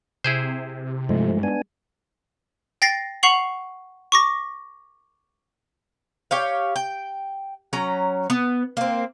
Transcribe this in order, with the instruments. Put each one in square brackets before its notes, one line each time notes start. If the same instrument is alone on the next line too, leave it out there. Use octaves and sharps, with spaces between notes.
[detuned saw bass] C3 [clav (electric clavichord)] E4 G#4 C5
[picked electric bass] G2 G#3 [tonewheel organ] F3 A3
[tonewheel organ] B3 D4 G#5
[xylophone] G5 A6 A#6 C7
F#5 C#6 C7 F7 F#7
C#6 D6 A#6
[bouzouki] G4 C#5 F5
G5
F#3 C#4 A#5
B3
A#3 C4